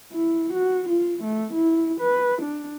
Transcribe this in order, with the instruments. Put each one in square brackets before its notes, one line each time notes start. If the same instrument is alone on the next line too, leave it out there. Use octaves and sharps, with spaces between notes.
[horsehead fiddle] E4
F#4
F4
A3
E4
B4
D4